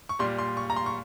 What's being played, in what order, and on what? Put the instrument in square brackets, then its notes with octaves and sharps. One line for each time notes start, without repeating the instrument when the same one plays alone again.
[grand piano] C#6
A#2 G3 C6
C6
C#6
A#5
C6
C#6